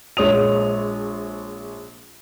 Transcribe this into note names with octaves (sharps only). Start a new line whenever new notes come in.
A#1 G#3 C#5 D#6 F7